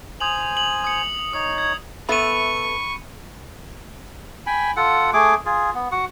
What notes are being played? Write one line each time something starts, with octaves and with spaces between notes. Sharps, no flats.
C5 G#5 D#6 F7 F#7
F#7
D#6 C#7
D#4 C#5 D#6
G#6
B3 A4 E5 B5 C#6 D#7
G5 G#5 B5
F4 A4 F#5
A3 G#4 D6
F4 G#4
B3
F#4 F#5